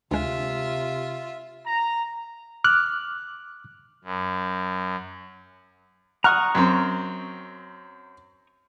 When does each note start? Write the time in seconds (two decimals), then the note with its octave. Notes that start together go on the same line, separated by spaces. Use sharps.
0.11 D2 C3 G#3 F4 E5
1.66 A#5
2.64 D6 F6 F#6
4.04 F#2
6.24 F#5 A#5 C#6 D#6 F6 F#6
6.55 F#2 C4